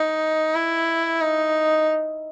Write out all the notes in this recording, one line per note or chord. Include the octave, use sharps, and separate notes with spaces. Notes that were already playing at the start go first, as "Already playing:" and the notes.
Already playing: D#4
E4
D#4